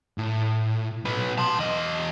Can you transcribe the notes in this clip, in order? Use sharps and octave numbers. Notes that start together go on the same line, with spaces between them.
A2
B1 B4
A5 C6
E2 D#5